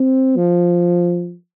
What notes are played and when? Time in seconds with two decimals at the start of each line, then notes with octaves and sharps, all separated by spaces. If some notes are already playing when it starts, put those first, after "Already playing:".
Already playing: C4
0.37 F3